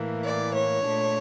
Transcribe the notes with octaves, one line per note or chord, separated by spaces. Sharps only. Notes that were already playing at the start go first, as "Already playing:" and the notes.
Already playing: A2 E3 A#3
D5
C#5
A#2 A3 D4